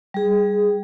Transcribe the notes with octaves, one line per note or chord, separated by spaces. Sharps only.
G3 G#4